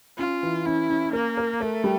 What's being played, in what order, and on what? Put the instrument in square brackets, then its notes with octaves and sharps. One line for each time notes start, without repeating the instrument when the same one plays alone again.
[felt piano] C#4 [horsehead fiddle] F4
[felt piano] E3
[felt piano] C#4 [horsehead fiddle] E4
[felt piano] C#4
[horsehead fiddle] A#3 [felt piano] A#4
[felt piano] A#4
[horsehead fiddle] A3 [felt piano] A#4
[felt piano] G3